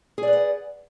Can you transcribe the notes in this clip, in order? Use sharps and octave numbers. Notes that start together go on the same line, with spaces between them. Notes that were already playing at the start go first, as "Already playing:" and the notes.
G#4 B4 D5 F#5